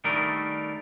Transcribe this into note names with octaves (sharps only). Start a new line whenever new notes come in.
D#3 G3 A3 D4 A#4